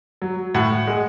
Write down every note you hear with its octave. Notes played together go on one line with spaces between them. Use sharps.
F#3
A2 F#5
G#3